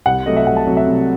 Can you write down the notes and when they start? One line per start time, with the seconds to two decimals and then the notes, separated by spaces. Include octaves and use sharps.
0.06 C2 F#5
0.26 C3 F#3 A3 D#5
0.37 E5
0.46 C2 F#5
0.56 A5
0.67 C3 F#3 A3
0.77 E5
0.87 C2